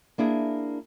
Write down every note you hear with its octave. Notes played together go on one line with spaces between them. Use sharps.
A#3 D4 E4 G#4